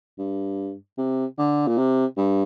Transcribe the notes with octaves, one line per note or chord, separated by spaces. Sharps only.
G2
C3
D3
A#2
C3
G2